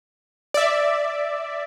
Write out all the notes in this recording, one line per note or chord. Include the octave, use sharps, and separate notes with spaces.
D5 E5